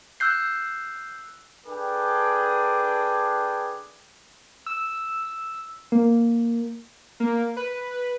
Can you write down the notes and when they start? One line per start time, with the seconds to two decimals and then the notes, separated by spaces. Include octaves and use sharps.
0.20 E6 F#6 G6 C7
1.67 D4 G#4 A4 B4 G5 D6
4.66 E6
5.92 A#3
7.20 A#3
7.57 B4